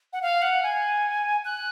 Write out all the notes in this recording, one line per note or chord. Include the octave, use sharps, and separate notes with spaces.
F#5
F5
F#5
G#5
F#6